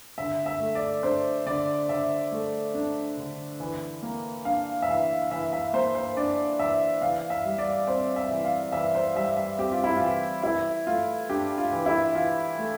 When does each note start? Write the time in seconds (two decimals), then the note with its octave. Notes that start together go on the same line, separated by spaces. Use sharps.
0.18 D3 E5
0.46 E5
0.60 A3
0.75 D5
1.03 D4 C5
1.45 D3 D5
1.89 D3 E5
2.31 A3
2.74 D4
3.17 D3
3.60 E3
4.02 A#3
4.45 D4 F5
4.82 E5
4.88 E3 F5
5.31 E3 E5
5.53 E5
5.73 A#3 C5
5.95 C5
6.17 D4 D5
6.59 E3 E5
7.02 E3 F5
7.30 E5
7.45 G3
7.58 D5
7.88 C4 C5
8.16 E5
8.31 E3
8.44 F5
8.73 E3 E5
8.95 C5
9.15 G3 E5
9.37 E5
9.58 C4 G4
9.72 F4
9.84 E4
9.97 E3 F4
10.43 E3 E4
10.87 A3 F4
11.30 D4 G4
11.58 F4
11.73 E3
11.86 E4
12.15 E3 F4
12.58 A3